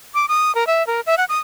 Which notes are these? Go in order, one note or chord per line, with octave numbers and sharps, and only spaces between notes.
D6
D#6
A#4
E5
A#4
E5
F#5
D#6